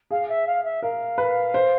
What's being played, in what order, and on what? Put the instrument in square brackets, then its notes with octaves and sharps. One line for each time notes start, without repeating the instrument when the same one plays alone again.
[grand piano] G#4 [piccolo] F5
[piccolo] E5
F5
E5
[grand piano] A#4 [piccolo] F5
[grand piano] B4
C5